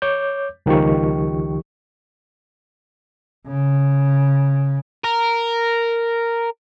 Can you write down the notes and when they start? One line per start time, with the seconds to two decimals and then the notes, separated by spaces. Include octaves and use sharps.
0.02 C#5 D6 G6
0.66 C#2 D#3 F3 G4 C#6
3.47 C#3
5.04 A#4